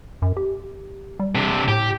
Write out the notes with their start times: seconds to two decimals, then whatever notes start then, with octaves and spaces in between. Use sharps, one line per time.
0.22 F#2
0.37 G4
1.20 G3
1.35 C3 D4
1.68 A2 G4